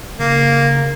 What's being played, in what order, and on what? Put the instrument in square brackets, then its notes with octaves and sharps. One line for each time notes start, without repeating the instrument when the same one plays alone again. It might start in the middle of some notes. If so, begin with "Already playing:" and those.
[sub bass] C#3 [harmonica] A#3